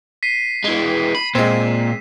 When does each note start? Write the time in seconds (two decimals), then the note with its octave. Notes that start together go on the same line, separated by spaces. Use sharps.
0.23 B6 C7 D#7
0.64 E3 G#3
1.15 B5
1.35 A#2 G#3 C4 E7